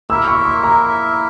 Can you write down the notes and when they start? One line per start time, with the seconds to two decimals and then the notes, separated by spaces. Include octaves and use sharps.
0.10 A#3 E4 A#4 E5 E6
0.28 C#6
0.45 C6
0.64 A#5